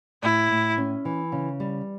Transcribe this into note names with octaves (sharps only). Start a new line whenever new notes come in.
A2 E4
A2
C#4
E3
C#3
G3